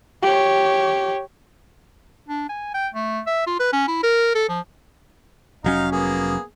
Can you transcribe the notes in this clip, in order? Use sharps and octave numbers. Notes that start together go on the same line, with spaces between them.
G4 C#5
D4
G#5
G5
A3
E5
F4
B4
C#4
E4
A#4
A4
F3
F1 F#3 C#4 D#4 F5 A#5
A#3 B3 G#4